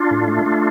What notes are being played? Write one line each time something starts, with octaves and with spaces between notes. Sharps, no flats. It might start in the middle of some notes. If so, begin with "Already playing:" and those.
Already playing: D4 F4
A2
A3
A3